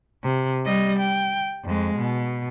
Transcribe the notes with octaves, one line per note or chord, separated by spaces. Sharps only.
C3
G3 D#5
G5
F2 G#3
B2